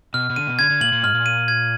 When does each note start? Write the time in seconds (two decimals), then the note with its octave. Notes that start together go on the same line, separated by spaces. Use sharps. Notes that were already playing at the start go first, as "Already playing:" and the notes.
0.14 B2 F6
0.30 B2
0.36 D3 D#7
0.47 B2
0.59 D3 G#6
0.70 D3
0.81 A#2 F#7
0.93 A#2
1.03 G#2 F6
1.15 A#2
1.26 D#7
1.48 G#6